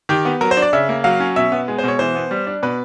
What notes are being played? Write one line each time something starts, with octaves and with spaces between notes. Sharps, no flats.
D#3 G4
B3
F#3 A#4
C5
D4
D5
C#3 E5
A#3
F#3 F5
C#4
B2 E5
B3
G#3
C5
B2 C#5
E3 C5
B3
G3
D4
B2 B4